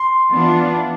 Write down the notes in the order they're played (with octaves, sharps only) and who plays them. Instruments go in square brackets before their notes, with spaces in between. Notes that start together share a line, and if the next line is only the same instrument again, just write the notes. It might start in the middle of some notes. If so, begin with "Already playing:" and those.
Already playing: [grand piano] C6
[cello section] E3 B3 D4 F4